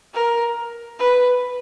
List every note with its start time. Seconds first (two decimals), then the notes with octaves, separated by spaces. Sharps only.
0.14 A#4
0.99 B4